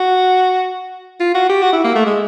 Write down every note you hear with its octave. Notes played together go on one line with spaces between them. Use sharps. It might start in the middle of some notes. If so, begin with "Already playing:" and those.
Already playing: F#4
F4
F#4
G4
F#4
E4
A#3
A3
G#3